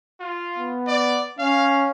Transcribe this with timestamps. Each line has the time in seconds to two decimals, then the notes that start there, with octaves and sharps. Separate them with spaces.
0.20 F4
0.58 B3
0.88 D5
1.39 C#4 F5